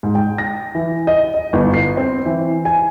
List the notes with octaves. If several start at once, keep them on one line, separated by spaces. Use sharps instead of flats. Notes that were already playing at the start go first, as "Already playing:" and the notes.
G#2
G5
A#6
E3
D#5
D#5
G1
C7
C4
E3
G#5